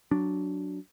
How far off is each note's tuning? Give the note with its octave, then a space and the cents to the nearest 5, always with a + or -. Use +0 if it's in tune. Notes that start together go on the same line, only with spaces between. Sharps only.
F#3 +0 D4 -5